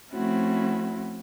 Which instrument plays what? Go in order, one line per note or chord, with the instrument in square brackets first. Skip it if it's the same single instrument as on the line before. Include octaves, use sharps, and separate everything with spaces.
[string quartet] F3 A3 C4 C#4 E4 F#4